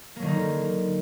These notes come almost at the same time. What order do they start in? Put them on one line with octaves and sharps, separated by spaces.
A#3 F#3 D#3 D3 D#4